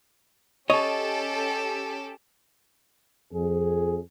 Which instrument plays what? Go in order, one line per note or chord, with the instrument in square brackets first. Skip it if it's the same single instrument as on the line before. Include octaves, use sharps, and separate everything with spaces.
[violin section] C#4 G4 A4 [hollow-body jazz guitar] C#5 D#5
[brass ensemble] F2 G#4